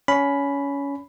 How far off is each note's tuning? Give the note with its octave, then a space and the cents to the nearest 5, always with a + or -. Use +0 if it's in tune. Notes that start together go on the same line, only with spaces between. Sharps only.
C#4 +20 B5 +0